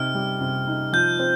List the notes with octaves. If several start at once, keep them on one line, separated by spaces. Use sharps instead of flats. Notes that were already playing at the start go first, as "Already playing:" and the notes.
Already playing: C3 D#4 F6
G3
C3
D#4
F3 G6
C4